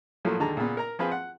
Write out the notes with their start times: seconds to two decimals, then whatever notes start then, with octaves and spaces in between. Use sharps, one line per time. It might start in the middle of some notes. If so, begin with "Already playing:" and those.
0.25 A2 F3 F#3 A3 A#3
0.40 D#2 D3 G#3 A5 A#5
0.57 A#2 C#3 B3
0.77 A#4 A#5
0.99 F3 C4 F4 G#4 B4
1.11 F#5